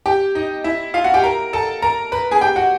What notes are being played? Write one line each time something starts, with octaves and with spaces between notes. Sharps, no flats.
G4 G5
D#4 D#5
E4 E5
F4 F5
F#4 F#5
G4 G5
A#4 A#5
A4 A5
A#4 A#5
B4 B5
G#4 G#5
G4 G5
F#4 F#5